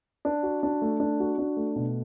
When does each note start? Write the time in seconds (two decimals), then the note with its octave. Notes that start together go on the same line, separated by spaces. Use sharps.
0.25 D4
0.43 F#4
0.63 D4
0.82 A3
1.00 D4
1.20 F#4
1.38 D4
1.57 A3
1.76 B2